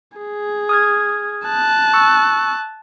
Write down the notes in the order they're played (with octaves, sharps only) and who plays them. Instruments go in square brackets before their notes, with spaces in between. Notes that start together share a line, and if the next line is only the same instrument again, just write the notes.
[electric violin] G#4
[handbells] D#6 F6 G#6
[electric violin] A5 F#6
[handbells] C#6 E6